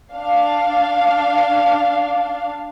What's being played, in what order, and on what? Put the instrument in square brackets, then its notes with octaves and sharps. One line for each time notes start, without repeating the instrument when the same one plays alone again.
[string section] D4 F5